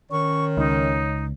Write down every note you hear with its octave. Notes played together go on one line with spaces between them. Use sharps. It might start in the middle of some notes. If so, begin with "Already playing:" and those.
D#3 C#4 C#5 C#6
C#2 D#4